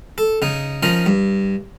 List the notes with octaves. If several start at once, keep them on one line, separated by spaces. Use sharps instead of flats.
A4
C#3 D#4
F3 C#4 D#4 A#4
G2